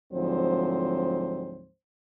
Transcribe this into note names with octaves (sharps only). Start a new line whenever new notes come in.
D2 G#2 F3 F#3 C4 C5